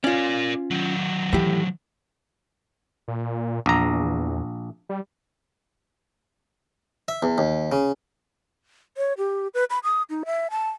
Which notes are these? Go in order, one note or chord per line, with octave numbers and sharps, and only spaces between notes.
C#4 F4 A#4 D5
D#3 F#3
A2 E3 G4
A#2
A#1 E2 A#5
G3
E5
E2
D#2
C#3
C#5
G4
B4
B5
D#6
D#4
E5
A5